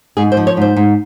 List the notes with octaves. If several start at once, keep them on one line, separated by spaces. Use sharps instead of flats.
G#2 G#4
C5
F3
C#5
G#2 C5
G#2